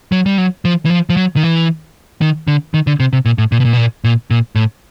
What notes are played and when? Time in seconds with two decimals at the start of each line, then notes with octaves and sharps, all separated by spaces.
0.12 F#3
0.26 G3
0.38 F#3
0.65 F3
0.85 E3
0.90 F3
1.10 F3
1.17 F#3
1.36 D#3
1.43 E3
2.21 D#3
2.48 D3
2.74 D#3
2.87 D3
3.00 C3
3.13 C3
3.25 A#2
3.38 A2
3.52 A#2
3.60 B2
3.65 A#2
3.73 B2
3.77 A#2
4.04 A#2
4.31 A#2
4.55 A2